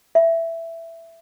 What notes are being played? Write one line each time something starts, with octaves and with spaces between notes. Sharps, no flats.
E5